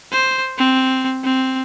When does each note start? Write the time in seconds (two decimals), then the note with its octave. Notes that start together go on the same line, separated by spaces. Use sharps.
0.12 C5
0.58 C4
1.24 C4